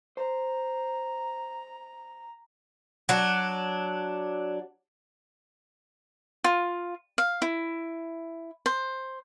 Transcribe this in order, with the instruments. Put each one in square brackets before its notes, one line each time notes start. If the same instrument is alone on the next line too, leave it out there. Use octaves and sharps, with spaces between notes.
[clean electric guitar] C5 [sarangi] A#5
[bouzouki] F#3 D4
[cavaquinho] F4
F5
E4
C5